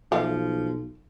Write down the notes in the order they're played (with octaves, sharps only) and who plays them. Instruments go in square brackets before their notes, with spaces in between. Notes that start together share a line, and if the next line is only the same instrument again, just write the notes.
[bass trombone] B1 [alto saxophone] F3 [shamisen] A4 E5 F5